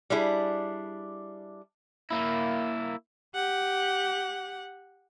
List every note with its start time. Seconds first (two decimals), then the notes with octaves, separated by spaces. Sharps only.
0.10 G3 D4 E4 G#4
2.11 A#3 E4
3.35 G4 F#5